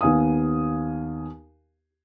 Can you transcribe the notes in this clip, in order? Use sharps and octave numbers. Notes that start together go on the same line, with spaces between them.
D#2 B3 F5 G#5 D#6